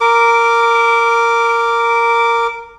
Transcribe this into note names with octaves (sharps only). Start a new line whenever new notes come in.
A#4 D6